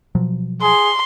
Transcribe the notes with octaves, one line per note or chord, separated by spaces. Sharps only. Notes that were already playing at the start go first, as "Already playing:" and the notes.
B2 F3 F#3
G#4 C6